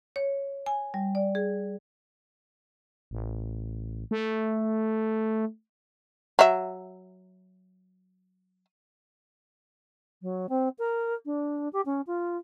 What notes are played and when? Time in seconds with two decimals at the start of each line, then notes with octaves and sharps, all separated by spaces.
0.16 C#5
0.66 G#5
0.94 G3
1.15 D5
1.35 G#4
3.11 A1
4.11 A3
6.39 F#3 E5
10.22 F#3
10.49 C4
10.78 A#4
11.25 D4
11.73 G4
11.85 C#4
12.07 F4